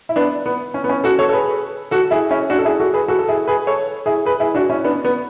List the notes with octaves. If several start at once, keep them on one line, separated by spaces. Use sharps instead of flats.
E4
B3 D4
B3
C#4
B3
C#4
F#4 A4
A4 C#5
A4
G#4 B4
F#4 A4
E4 G#4
C#4 E4
D4 F#4
A4
E4 G#4
F#4 A4
G#4 B4
F#4 A4
A4
E4 G#4
G#4 B4
A4 C#5
E4 G#4
G#4 B4
E4 G#4
D4 F#4
C#4 E4
B3 D4
B3